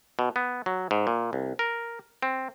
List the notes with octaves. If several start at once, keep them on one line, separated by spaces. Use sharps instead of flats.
B2
B3
F#3
G#2
A#2
C2
A#4
C4